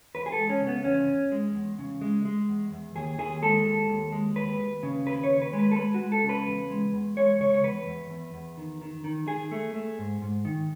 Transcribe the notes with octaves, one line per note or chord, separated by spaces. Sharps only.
E2 B4
G#4
A4
G#3
C#4
C#3
B3
E2 C#4
E2
G#3
E2
C#3
G#3
G#3
E2
E2
D#2 G#4
D#2 G#4
G#3 A4
D#2
D#2
G#3
D#2 B4
D#2
C#3
D#2 B4
C#5
D#2
B4
G#3
B4
A4
G#3 B4
F#4
G#3
A4
C#3
B4
E2
G#3
E2
G#3 C#5
C#3 C#5
C#5
E2 B4
E2
E2
E2
D#3
D#3
D#3
D#3 G#4
A3
A3
G#2
G#2
D#3